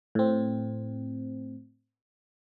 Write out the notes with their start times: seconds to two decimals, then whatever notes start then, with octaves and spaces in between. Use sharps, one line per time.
0.15 A2 C4